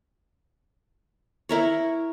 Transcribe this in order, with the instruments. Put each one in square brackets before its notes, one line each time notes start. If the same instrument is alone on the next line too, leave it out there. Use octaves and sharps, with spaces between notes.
[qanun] E4 A#4 C#5